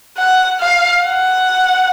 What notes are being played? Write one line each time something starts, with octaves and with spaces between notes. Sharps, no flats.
F#5
F5
F#5